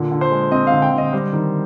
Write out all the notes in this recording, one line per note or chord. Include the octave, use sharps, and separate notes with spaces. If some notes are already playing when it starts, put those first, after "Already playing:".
Already playing: A#2 D3
D3
C5
G#3
C4 D#5
F5
D3
G5
D3
D#5
G3 C5
D#3